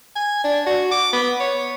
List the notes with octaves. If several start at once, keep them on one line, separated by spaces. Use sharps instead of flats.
G#5
D4
F#4
D6
B3
C#5